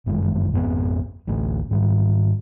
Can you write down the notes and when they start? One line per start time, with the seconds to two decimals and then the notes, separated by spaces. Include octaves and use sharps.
0.06 G1 F#2 D#3 G#3
0.52 G#1 F2 B3
1.27 A1 D2 A2 A3
1.71 G#2 D#3 G3